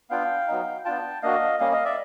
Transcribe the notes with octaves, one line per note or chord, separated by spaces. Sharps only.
B3 D4 F4 F5 G5
F#3 B3 D#4
B3 D4 F4 G5 A5
A#3 D4 F#4 D#5 F5
G3 A#3 C#4 D#5 F5
D#5 F5
D5 E5